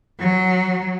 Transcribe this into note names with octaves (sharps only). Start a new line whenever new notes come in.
F#3